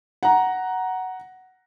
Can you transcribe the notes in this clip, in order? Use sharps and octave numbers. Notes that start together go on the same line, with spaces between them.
F#5 A#5